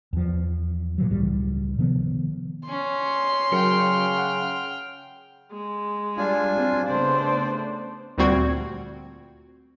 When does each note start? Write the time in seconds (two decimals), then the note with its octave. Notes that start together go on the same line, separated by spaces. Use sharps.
0.13 E2 F3
0.98 A#2 E3 F#3
1.10 C#2 A2 G3
1.79 C3 D#3 F3 B3
2.68 C#4 C6
3.52 C#3 F#3 A#4 G5 F6 C#7
4.19 F#5
5.52 G#3
6.17 G3 D4 F4 G#5
6.55 F#3 G3 C4
6.87 C#3 A3 B3 D4 C5 D5
8.18 D2 A#2 G3 C4 F#4 G#6